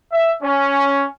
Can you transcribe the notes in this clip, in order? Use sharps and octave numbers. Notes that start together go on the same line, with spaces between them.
E5
C#4